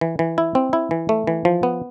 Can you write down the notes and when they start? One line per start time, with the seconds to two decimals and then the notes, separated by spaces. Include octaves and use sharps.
0.01 E3
0.19 E3
0.38 E4
0.55 C4
0.73 E4
0.91 E3
1.09 A3
1.27 E3
1.45 F3
1.63 B3